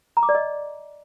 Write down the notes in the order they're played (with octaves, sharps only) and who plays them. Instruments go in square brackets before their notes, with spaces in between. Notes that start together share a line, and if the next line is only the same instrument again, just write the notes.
[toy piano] A#5
D6
D5
D#5